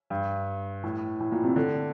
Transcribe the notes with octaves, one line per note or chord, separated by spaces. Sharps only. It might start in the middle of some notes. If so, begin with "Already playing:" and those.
G2
A2
A2
A#2
C3
D3